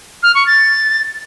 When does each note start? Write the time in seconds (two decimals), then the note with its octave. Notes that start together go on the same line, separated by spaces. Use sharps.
0.23 F6
0.35 C#6
0.47 A6